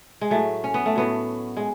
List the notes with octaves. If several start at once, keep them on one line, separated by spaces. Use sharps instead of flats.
G#3
A2 F#3 A3
C#4
B3
A3
A2 F#3 B3
G#3